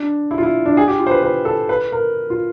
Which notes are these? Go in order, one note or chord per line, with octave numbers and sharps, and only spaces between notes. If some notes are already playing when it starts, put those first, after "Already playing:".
Already playing: D4
E4
F4
E4
D4
G#4
G4
F4
C5
B4
B4
A4
B4
A#4
F4